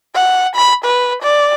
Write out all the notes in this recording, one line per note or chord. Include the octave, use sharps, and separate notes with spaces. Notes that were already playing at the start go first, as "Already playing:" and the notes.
F#5
B5
B4
D5